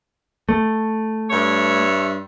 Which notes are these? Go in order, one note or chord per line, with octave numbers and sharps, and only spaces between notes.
A3
G2 C#5 E5